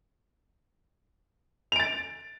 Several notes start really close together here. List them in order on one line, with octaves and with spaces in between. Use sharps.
F7 D7 A6